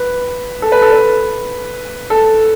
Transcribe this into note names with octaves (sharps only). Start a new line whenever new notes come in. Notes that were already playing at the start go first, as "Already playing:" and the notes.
Already playing: B4
A4
B4
A4
B4
A4